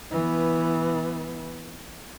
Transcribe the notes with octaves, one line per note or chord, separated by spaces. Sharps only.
E3 B3